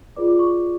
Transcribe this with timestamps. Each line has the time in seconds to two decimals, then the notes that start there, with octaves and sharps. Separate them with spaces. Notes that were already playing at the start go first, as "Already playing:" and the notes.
0.16 F4 G#4 B4 D5 D6
0.28 D6
0.39 C#6